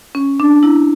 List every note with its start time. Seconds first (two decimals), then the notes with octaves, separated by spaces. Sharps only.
0.15 C#4
0.40 D4
0.63 E4